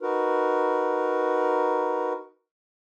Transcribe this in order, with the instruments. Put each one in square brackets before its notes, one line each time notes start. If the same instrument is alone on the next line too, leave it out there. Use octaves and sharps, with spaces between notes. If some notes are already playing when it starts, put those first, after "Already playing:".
[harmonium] D#4 F#4 A#4 B4